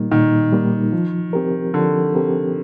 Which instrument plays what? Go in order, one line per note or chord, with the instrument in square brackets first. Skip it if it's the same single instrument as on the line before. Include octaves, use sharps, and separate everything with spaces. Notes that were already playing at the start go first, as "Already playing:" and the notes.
Already playing: [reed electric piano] A#2 G3 A#3 D#4 [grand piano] D#3
[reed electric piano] A#2 [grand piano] D#3
[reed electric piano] G3 A#3 D#4
F3
C4 G4 A#4
[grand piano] D3 [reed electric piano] F3
[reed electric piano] C4 G4 A#4